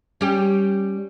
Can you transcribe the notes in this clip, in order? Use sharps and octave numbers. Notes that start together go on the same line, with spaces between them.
G3 C#4 G4